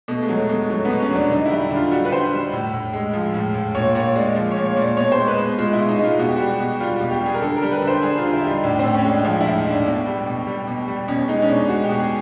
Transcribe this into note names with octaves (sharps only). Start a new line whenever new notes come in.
B2 A3
G#3
F#3 A3
B2 G#3
F#3 A3
B2 B3
C#4
F#3
D4
D3 D#4
G3 E4
E4
D3
F4
G3 F#4
B4
D3 C5
G3
A2
A2
G#3
F3
A2
A2
A#2 C#5
A#2 C#5
G#3 D5
F3
A#2 C#5
C#5
A#2
D5
B2 C#5
C5
G#3
B4
B2
G#3 F4
E4
B2
D#4
G#3 F4
B2 F#4
G4
G3 F#4
B2
G3 F4
B2 G4
G4
G3
G#4
A#4
D3 A4
A#4
G3
B4
D3
C5
G3 G#4
D3 F4
E4
G3 D#4
A2 D4
A2 C4
C#4
G#3
D4
F3 D4
A2 E4
D#4
A2
D4
B2
G3
B2
G3
B2
G3
B2 C#4
G#3 D#4
C#4
B2 D4
G#3 F#4
G4
B2
G#4